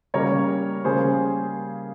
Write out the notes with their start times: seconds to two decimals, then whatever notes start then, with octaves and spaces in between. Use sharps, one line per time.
0.14 C#3 G3 A#3 A#4 C#5
0.85 C#3 G3 A#3 G#4 C5